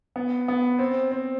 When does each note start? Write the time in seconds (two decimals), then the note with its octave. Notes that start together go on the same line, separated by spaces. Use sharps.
0.16 B3
0.48 B3
0.79 C4
1.11 C4